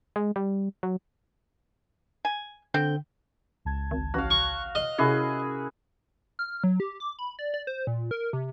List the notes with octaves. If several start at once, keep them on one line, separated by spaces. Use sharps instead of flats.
G#3
G3
F#3
G#5
D3 C4 G5
C#2 A5 G#6
G#1
A1 F#4 F5
C#6
D#5 F5
C3 C#4 E4 F#4 G#4 A#4
F6
F#3
G4
D6
B5
D5
D5
C5
A#2
A#4
C3